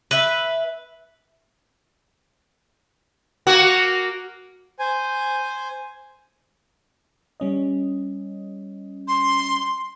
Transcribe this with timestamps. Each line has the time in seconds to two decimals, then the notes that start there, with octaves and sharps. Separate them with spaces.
0.11 B4 E5
3.47 A#3 F#4
4.79 C5 G#5
7.40 G3 C#4 D#5
9.08 C6